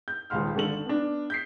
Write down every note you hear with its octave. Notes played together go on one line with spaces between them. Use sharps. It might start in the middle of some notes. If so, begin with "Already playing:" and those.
G6
D#1 C#2 F5 C6 F6
G#1 D3 A4 F#7
B3 D4
G6 B6 C7